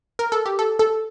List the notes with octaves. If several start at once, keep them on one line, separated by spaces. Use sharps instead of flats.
A#4
A4
G4
A4
A4